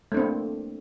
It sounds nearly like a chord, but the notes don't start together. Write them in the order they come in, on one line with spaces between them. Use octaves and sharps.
A3 D4 C4 A#3